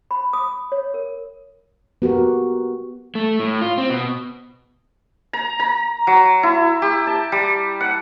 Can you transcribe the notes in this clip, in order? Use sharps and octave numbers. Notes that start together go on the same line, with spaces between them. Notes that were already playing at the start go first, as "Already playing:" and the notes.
B5
D#6
C#5
A#4
B3 F#4 G4 A#4
A3
A2
F4
C4
B2
A#5
A#5
F#3
E4
G4
A5
G3
F#5